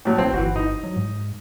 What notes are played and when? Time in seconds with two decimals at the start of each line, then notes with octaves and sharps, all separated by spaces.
0.05 A2 F#3
0.18 B1 C4
0.34 G1 E3 F#4
0.56 D#4
0.83 F#3
0.96 G#2